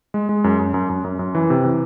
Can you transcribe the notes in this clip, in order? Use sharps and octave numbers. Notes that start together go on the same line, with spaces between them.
G#3
G#3
F#2
F#2
F#2
F#2
F#2
F#2
E3
C3
E3